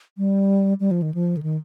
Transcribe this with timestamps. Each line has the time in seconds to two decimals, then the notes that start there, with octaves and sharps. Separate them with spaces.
0.18 G3
0.80 G3
0.91 F3
1.02 D#3
1.14 F3
1.37 D3
1.43 D#3